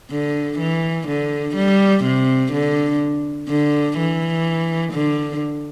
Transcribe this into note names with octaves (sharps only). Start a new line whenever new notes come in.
D3
E3
D3
G3
C3
D3
D3
E3
D3